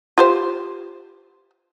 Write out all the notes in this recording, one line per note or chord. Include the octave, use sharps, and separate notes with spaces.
F4 G4 C5